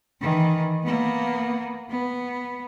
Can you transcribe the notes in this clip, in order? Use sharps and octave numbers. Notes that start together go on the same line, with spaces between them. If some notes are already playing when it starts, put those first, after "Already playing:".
D#3 E3
A#3 B3
B3